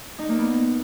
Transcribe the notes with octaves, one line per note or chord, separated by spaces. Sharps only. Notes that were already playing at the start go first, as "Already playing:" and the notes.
D#4
A#3
B3